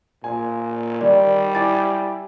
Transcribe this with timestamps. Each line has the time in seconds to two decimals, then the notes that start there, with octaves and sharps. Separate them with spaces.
0.24 A#2 G#5
1.01 D#3 G3 D5
1.55 E4 G#5 D6 A6